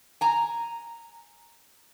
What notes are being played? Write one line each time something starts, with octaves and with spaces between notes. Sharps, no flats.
G#5 A#5